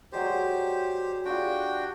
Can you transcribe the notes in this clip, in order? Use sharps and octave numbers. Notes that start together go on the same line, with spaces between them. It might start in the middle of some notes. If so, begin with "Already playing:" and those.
F#3 G#3 G4 C5 D5
D4 F4 F#4 G#4 G5
G4 D5